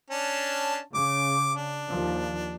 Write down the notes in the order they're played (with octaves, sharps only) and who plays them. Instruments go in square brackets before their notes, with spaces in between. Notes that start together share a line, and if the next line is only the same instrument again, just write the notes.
[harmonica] C#4 D4 A5
[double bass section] C#3 [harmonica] D6
[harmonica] D4
[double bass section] D#2 F3